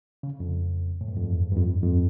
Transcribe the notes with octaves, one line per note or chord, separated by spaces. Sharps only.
C#3
F2
A2
G2
F2
E2
G2
F2
G2
E2
F2